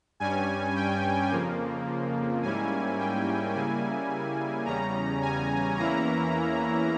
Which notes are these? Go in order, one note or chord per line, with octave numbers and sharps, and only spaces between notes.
G2 G3 C#4 G#5
G5
F2 C#3 F3 A#3
G#2 G3 A#3 C#4 E4 G#5
G5
C#3 G3 A#3 E4 G#5
E2 C#3 G3 C#4 A#5
G#5
E2 E3 A#3 C#4 E4 A#5